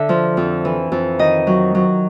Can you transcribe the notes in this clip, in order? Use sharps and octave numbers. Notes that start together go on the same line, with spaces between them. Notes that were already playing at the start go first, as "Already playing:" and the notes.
Already playing: D3 E5
F3
F2
E3
F2
D#3 D#5
F#3
F#3